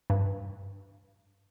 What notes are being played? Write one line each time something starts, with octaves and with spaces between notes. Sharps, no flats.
G2